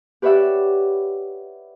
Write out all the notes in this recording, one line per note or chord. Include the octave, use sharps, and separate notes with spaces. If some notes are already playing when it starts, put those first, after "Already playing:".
G4 B4 C#5 D5 E5 F#5